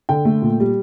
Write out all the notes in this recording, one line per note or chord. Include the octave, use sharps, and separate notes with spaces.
D3 G5
A3
A#2
G3